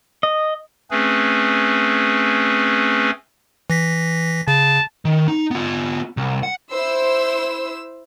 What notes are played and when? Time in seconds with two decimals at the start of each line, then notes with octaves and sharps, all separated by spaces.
0.23 D#5
0.91 A3 C4 C#4 G#4 B4
3.70 E3 A#6 B6
4.48 C#3 A5
5.05 D#3
5.28 D#4
5.51 B3 F4
6.17 C2
6.43 F#5
6.71 E4 C5 E6